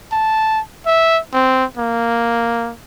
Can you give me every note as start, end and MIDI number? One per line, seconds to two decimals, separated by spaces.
0.12 0.60 81
0.86 1.20 76
1.33 1.65 60
1.78 2.73 58